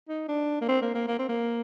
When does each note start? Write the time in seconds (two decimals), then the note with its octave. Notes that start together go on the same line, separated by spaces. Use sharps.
0.09 D#4
0.28 D4
0.61 A#3
0.68 C4
0.82 A#3
0.95 A#3
1.08 A#3
1.19 C4
1.29 A#3